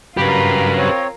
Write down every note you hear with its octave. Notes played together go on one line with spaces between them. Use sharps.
G2 C#3 F#3 F4 G4 A#4 B4 B5
C4 C#5